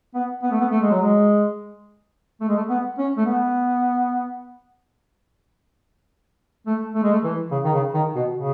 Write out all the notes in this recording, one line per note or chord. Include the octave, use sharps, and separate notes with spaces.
B3
B3
A3
B3
A3
G#3
F#3
G#3
A3
G#3
A3
B3
C#4
A3
B3
A3
A3
G#3
A3
E3
C#3
D#3
C#3
D#3
B2
C#3